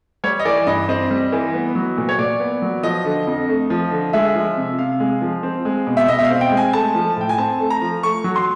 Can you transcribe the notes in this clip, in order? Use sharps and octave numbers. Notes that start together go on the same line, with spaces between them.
G3 C#5
D#5
E3 D5
G2 D#5
C4 D#5
G3
E3
B3
F#3
A#2
C#5
A#2 D5
B3
F#3
F3 D#5
D3
F2
A3
F3
D3
G#3 E5
F3
C3
C3 F5
G#3
F3
C4
G#3
B2
E5
B2 D#5
E5
F5
C4
G5
G#3
G#5
A3 A5
F3
A2 G5
G#5
C4 A5
A3
A#5
F3
A3 C#6
F#3
C6